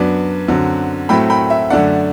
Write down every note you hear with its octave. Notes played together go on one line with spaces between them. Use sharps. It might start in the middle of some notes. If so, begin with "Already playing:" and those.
Already playing: F#2 F#3 B3 D4
F#2 D3 F#3 C4
A2 F#3 A3 C4 G5 B5
G5 B5
E5
F#2 D3 A3 D4 D5 F#5